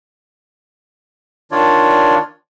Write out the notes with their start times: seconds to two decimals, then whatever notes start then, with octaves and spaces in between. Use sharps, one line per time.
1.52 D#3 D4 F4 C#5 D5